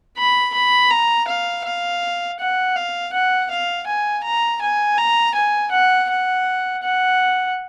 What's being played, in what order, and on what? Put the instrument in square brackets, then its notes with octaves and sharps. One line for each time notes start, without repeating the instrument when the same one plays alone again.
[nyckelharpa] B5
B5
A#5
F5
F5
F#5
F5
F#5
F5
G#5
A#5
G#5
A#5
G#5
F#5
F#5
F#5